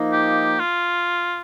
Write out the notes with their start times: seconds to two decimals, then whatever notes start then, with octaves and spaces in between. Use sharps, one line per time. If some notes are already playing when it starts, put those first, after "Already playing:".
Already playing: F3 A#3 D#4
0.12 G4
0.59 F4